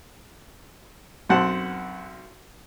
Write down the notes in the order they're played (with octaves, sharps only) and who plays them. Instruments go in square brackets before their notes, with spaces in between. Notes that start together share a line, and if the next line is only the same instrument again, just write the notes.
[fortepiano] B1 F#2 C4 F#5 A5 C6